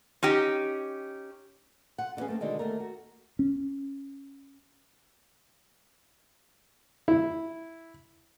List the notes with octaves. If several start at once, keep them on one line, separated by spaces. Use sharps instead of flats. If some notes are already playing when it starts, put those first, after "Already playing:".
C#4 D#4 G4
F4 F#5
D3 E3 B3 C#4 G#4
A3 A#3 C4
B2 D3 D#3 G#3
D#2 A3 A#4
F#4
C#4
E4